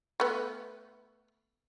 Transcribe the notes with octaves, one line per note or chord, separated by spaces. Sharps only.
A3 B3